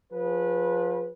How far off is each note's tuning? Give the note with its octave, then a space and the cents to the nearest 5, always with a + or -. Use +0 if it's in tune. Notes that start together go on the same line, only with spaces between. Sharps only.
F3 +25 G#4 +0 B4 -20